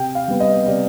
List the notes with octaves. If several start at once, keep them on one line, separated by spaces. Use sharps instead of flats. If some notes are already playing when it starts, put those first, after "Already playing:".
Already playing: C3 G5
F5
G3 B3
D#5
C3 D5